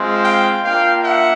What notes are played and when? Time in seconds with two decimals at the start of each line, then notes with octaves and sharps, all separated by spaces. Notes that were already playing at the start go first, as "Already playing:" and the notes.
Already playing: G#3 C4 F4
0.24 F5 G5
0.64 A#3 D4 F4 F5 G5
1.04 E5 F#5